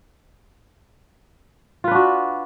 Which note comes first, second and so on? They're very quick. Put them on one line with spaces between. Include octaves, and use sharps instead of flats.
F4 B4 D4 F#4